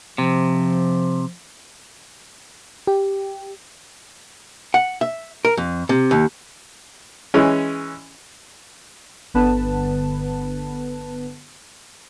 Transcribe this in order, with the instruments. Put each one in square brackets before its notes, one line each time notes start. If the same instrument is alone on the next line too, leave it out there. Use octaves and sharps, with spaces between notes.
[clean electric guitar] C3 [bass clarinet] F3
[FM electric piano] G4
[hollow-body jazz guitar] F#5
E5
A#4
F2
C3
D#2
[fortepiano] E3 G#3 C#4
[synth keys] G1 D3 B3 B4 A5